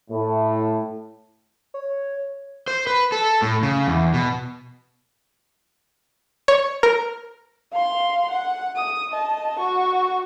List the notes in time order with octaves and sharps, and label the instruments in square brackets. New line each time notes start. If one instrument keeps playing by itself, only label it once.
[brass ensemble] A2
[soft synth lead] C#5
[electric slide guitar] C5
B4
A4
A2
C#3
E2
B2
[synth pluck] C#5
A#4
[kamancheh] F5 C6
F#5
D#6
D#5 A5
F#4 C#6